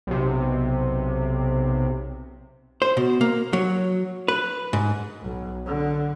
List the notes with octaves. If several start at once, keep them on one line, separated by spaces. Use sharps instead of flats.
B1 C3
C5
B2
A#3
F#3
B4
G#2
B1
D3